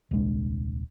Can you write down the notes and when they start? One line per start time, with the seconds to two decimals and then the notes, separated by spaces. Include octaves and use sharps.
0.11 D#1 C2 G#3 D4